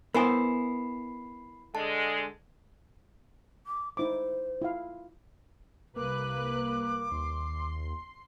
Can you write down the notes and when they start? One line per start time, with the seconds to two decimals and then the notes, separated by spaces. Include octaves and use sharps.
0.14 B3 E4 A#4 C5 G#5 B5 D#6 C7
1.75 D3 G#3 A5
3.67 D6
3.97 D#4 E4 C5 D6
4.62 E4 F4 F5
5.96 C2 A#3 B4 D6 F#6
7.12 D#2 C6